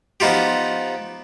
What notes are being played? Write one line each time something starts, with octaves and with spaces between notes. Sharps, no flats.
F3 B3 D#4 F4 G4